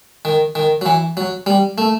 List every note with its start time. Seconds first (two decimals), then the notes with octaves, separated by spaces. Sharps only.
0.25 D#3
0.55 D#3
0.81 F#3
0.86 E3
1.17 F#3
1.46 G3
1.78 A3